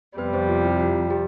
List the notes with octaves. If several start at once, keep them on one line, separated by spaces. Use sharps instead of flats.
F2 C3 G3 B3 B4
C4 C5
F4
E4
F4
G4